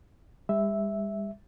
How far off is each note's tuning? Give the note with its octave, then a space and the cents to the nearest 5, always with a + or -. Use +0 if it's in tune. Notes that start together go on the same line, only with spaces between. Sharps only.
G3 +45 E5 -5